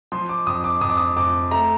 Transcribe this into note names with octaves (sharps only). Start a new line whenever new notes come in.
F3 C6
D6
F2 D#6
D6
F2 D#6
D6
D#6
F2 D6
A3 A#5